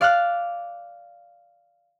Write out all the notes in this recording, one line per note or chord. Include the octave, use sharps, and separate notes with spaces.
D5 F5 D6 F6 F#6